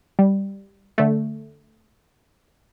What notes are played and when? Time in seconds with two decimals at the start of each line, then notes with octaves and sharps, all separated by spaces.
0.19 G3
0.98 D3 A3